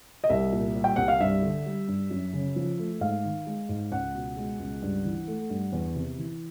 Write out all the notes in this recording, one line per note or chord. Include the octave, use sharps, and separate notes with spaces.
D#5
C2 E5
A#2
G3
G5
C2 F#5
F5
G2 E5
D3
G3
G2
F#2
C#3
F3
A3
G#2 F5
D#3
G#3
G#2
C#2 F#5
B2
G#3
C#2
G2
E3
A3
G2
E2
C3
E3